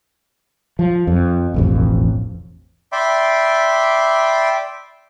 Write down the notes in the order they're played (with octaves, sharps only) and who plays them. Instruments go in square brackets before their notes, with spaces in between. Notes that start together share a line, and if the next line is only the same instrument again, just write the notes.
[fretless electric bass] F3
F2
E1 A1 F2
[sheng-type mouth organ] D5 E5 G5 B5 C6 D6